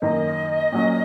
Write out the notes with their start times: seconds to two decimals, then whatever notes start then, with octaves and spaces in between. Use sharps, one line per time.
0.02 F#2 D#3 A#3 D#4 D#5
0.72 A#2 F#3 C#4